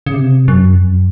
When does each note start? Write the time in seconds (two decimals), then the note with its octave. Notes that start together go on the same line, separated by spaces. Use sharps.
0.06 C#3
0.14 C3
0.48 F#2
0.73 F2
0.82 F#2